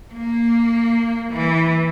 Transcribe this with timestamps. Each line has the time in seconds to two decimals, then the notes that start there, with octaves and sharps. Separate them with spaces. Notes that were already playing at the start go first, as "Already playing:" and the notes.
0.14 A#3
1.32 E3